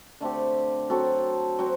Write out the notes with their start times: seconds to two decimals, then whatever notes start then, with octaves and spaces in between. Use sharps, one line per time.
0.21 D3 A3 C4 G4
0.90 F#3 C4 F#4 A4
1.59 F#3 C4